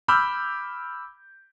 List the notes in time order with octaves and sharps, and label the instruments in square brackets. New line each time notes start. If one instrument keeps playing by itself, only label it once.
[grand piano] B5 D6 E6 F6 G6